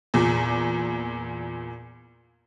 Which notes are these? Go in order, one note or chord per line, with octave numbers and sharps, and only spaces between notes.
E2 A#2